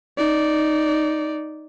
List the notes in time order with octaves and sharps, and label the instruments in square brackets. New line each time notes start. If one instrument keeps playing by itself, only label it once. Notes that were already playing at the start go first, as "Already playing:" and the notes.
[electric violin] D#4 D5